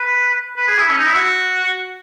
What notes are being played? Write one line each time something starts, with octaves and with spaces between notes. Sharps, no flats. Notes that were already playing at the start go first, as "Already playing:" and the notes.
Already playing: B4
B4
G#4
E4
C#4
D#4
E4
F#4